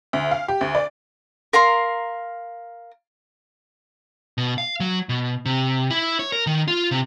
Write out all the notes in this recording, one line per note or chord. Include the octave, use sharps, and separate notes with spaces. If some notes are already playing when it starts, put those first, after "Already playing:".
D2
F5
G4
D2
D5
A#4 F5 A#5 C6
B2
F5
F#3
B2
C3
E4
C#5
A#4
D#3
F4
C3